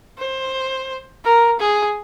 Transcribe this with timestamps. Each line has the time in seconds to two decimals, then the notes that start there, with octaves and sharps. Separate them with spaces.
0.18 C5
1.25 A#4
1.60 G#4